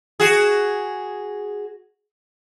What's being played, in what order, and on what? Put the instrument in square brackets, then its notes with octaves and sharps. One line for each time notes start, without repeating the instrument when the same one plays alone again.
[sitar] F#4 G#4